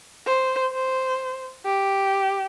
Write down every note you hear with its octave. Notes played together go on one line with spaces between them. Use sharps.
C5
C5
G4